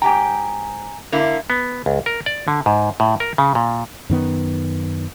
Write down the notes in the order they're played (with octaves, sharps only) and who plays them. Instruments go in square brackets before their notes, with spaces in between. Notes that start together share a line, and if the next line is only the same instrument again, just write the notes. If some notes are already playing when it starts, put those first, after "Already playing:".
[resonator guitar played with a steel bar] G#2 G4 G5 [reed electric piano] G#5 A#5
[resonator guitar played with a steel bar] D3 A#3 E4
[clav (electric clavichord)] B3
C#2
A#4
D5
D3
G#2
A2
A#4
C#3
A#2
[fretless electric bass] F#2 D#3 B3